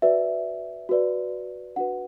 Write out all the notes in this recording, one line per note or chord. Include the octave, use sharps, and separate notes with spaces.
F#4 B4 D5 E5
F#4 B4 D5
D4 F#4 B4 F#5